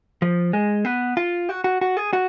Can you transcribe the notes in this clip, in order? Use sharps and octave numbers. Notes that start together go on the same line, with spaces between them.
F3
G#3
B3
F4
F#4
F#4
F#4
G#4
F#4